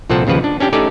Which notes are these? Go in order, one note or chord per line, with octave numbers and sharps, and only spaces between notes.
C2 A#2 F3 C4 A4 F#5
D#2 C#3 F3 B4 F#5
D4
C#4 D4 G4 G5
A3 C#4 D#4 G4 A4 D5